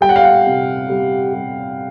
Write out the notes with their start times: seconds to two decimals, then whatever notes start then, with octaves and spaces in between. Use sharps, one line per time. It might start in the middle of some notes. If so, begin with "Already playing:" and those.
0.01 G3 G5
0.09 F#5
0.16 F5
0.24 F#5
0.46 C3
0.89 G3
1.34 G3